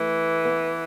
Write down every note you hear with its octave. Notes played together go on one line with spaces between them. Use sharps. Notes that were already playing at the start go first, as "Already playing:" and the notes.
Already playing: E3 A3
B3